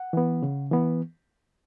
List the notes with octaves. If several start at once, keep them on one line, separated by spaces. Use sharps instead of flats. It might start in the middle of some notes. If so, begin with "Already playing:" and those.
Already playing: F#5
E3 B3
C#3
E3 B3